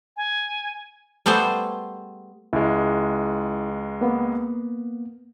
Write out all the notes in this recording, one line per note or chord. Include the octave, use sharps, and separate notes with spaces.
G#5
G3 A3 B3 G#4 C5
C#2 G#3 E4
A#3 B3